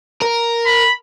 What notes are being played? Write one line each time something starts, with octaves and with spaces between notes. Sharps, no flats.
A#4
B5